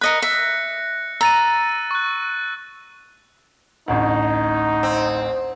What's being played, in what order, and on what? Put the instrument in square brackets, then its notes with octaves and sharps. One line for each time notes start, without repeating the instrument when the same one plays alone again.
[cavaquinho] A#4 D#5 B5 [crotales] F#6 A#6 C#7
[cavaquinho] E5
[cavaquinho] A#5 [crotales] E6 A6 D#7
[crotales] C#6 F#6
[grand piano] A1 D2 [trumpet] D#4
[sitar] C4